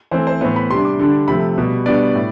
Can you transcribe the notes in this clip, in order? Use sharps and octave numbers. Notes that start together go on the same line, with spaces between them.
E3 A3 C4 C5
C5
A2 E3 B3 C5
B5
C3 G3 D4 C6
D6
D3 G3 D4
C3 F3 A3 B5
B2 G3 B3
B2 G3 B3 D4 D5
A2